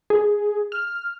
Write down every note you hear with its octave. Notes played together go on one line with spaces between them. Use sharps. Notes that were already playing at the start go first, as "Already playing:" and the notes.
G#4
F6